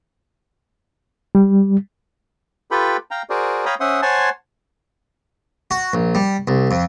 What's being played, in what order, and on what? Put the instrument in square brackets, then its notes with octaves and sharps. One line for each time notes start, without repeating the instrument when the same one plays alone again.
[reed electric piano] G3
[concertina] F4 G4 A4 B4 G5 B5
F5 G5 A#5
F#4 G#4 A#4 C5 D5
C#5 F5 G5 A#5 B5 D#6
C#4 C5 E5 F#5 C6 D#6
C5 C#5 F#5 G#5 A5 C6
[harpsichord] F#4
A#1
G3
C2
F2